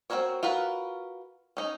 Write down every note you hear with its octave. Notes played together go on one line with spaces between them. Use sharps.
C4 D#4 F#4 A#4 C#5
F4 F#4 A#4 B4
C#4 D#4